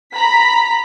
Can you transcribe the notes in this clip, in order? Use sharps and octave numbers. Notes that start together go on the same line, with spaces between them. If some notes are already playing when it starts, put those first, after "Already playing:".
A#5 B5 B6